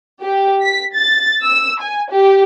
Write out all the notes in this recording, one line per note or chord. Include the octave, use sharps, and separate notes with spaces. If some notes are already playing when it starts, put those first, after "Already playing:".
G4
B6
A6
E6
G#5
G4